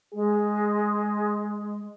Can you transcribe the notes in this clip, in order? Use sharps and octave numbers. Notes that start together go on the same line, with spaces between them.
G#3 G#4